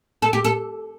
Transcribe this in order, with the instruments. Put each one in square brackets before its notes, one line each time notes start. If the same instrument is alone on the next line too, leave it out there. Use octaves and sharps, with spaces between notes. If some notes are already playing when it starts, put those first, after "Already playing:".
[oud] A4
G4
A4